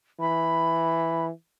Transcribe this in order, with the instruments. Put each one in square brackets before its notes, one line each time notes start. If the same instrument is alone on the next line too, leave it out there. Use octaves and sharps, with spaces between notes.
[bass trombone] E3 [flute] B5